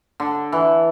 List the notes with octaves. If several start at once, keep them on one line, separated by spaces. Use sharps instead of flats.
D3
E3